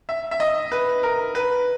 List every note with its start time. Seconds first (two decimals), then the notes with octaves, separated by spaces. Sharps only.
0.09 E5
0.31 E5
0.40 D#5
0.72 B4
1.03 A#4
1.35 B4